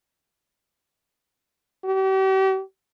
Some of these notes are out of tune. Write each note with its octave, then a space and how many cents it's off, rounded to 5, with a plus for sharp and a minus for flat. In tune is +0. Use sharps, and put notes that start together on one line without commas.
G4 -40